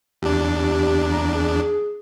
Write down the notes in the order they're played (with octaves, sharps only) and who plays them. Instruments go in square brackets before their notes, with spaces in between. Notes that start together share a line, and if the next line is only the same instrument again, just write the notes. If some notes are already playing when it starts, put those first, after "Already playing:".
[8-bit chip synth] E2 D4 [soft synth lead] G4
[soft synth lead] A#5
G#4